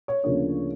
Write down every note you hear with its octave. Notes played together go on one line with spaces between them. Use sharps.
C#5
D2 C#3 F3 A#3 D4 C#5